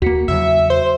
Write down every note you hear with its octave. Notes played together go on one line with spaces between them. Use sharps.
D#2 A#3 F#4 B6 C#7
E2 C#3 F#3 E5
C5